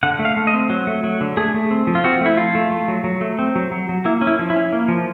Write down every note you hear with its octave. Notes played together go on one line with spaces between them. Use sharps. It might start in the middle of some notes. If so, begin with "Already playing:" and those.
D3 F#5
A3
F5
A3
D#5
C4
F#3
A3
F#3
D3
A3 G#4
A3
C4
F3
F4
C4 F#4
A3 E4
F3 F4
A3
A3
F#3
F#3
A3
C4
F#3
F#3
F#3
A#3 E4
C#4
E4
F3
E4
C#4
A#3
F3